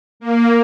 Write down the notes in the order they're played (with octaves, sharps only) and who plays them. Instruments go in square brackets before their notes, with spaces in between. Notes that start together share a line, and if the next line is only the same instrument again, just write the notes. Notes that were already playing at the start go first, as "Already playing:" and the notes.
[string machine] A#3